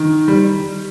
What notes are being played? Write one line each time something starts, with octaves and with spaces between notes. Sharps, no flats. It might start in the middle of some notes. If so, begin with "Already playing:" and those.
Already playing: D#3
G3